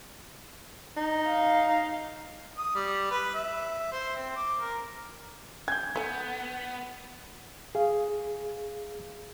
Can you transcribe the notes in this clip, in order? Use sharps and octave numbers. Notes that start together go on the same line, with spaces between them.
D#4
F5
D#6
G3
B4
E5
C5
C4
D6
A#4
G#5 G6 G#6
B3 A4 G#5
G#4 F5